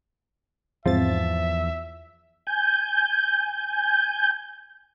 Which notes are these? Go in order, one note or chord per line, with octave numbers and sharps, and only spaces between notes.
E2 G#2 F3 C4 E5 A6
G#5 G6